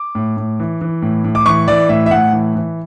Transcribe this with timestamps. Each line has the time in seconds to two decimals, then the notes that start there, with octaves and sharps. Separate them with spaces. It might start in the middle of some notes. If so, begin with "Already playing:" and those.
Already playing: D6
0.15 A2
0.37 A2
0.60 E3
0.81 E3
1.02 A2
1.24 A2
1.35 D6
1.46 E3 C#6
1.68 E3 D5
1.89 A2 E5
2.06 E5
2.11 A2 F#5
2.33 E3
2.55 E3